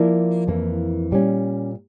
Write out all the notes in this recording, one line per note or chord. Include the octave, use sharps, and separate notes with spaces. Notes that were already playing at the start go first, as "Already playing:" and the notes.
Already playing: F3 A#3 E4 A#4 D5
F2 E3 A#3
A#2 G3 C#4